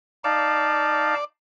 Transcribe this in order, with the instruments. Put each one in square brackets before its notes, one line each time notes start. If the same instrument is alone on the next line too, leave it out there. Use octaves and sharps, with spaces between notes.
[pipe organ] D#4 F5 A5 [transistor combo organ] D5